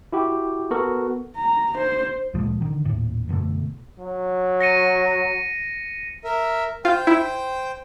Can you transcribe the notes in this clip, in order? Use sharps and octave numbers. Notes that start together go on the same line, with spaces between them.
E4 F#4 G4
B3 F#4 A4 A#4
A#5
C5
D2 A#2 F3 G#3
D3 D#3
D#1 A2
F#2 B2 D3 A3
F#3
A#6 C#7 D#7
A#4 E5
F4 C5 G5
E4